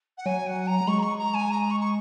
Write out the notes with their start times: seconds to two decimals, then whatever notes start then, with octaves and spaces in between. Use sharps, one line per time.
0.17 F#5
0.26 F#3 G#5
0.46 F#5
0.67 A#5
0.81 F#3
0.87 G#3 C#6
0.99 A#5
1.03 C#6
1.18 A#5
1.34 G#5
1.50 A#5
1.70 C#6
1.81 C#6